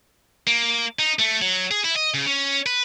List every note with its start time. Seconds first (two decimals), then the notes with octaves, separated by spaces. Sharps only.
0.47 A#3
0.99 D#4
1.19 A3
1.42 F#3
1.71 G#4
1.84 E4
1.96 D#5
2.14 C#3
2.26 C#4
2.66 B4